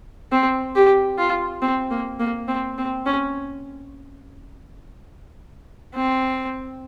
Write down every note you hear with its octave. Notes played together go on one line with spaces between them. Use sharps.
C4
G4
F4
C4
A#3
A#3
C4
C4
C#4
C4